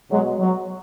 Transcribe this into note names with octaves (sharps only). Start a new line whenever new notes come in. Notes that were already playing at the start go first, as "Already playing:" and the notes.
B2 F#3 G#3
F#3